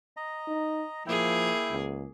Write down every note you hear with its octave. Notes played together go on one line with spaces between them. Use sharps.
D#5 A#5
D#4
F3 A#3 E4 G#4 G5
C#2